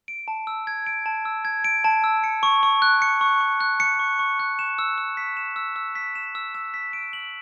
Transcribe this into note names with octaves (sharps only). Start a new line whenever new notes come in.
D7
A5
E6
G#6
D7
A5
E6
G#6
D7
A5
E6
C#7
C#6
C#6
F#6
C#7
C#6
C#6
F#6
C#7
C#6
C#6
F#6
E7
E6
E6
B6
E7
E6
E6
B6
E7
E6
E6
B6
D7
F#7